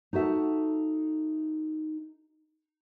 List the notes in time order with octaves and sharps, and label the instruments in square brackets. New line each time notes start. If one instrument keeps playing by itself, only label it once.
[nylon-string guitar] D#4 F#4 A4 E5